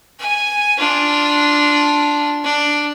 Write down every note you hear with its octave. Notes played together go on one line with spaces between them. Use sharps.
G#5
D4 F4
D4